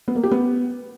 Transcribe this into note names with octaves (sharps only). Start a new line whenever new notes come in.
B3
A#3
G4
B3